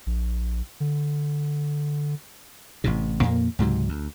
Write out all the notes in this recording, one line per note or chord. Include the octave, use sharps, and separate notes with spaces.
A#1
D3
A1 A2 C3
F2 A#2 A#3
C#2 G#2 C3 F#3
D2